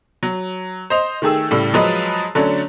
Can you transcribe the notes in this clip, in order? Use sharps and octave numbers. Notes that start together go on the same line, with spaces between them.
F#3
C5 D#5 F7
D#3 A3 G4 G#4 E6
A2 C#3 G3 A4
F3 F#3 G#3 B4 D#5
D3 F#3 A3 C#4 D4